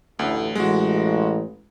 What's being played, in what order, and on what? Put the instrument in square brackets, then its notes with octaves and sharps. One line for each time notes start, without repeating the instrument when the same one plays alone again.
[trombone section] A1 [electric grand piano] D2
[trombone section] A1 [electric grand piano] G#3 F#4